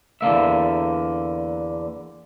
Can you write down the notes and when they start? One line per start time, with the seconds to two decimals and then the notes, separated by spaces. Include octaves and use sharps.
0.21 E2 D3 A#3 E5